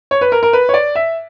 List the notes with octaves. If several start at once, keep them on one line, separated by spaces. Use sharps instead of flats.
C#5
B4
A#4
A#4
B4
C#5
D5
E5